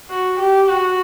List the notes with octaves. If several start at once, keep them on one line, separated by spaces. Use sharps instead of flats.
F#4
G4
F#4